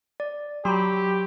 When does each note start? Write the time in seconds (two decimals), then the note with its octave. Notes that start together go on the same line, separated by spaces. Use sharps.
0.20 D5
0.65 F#3 G4 B5 C6